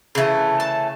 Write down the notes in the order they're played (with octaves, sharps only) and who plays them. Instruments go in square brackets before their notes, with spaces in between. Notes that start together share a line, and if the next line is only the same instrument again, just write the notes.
[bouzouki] C#3 E3 A3
A5